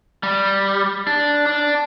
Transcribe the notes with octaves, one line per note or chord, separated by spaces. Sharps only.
G3
D4
D4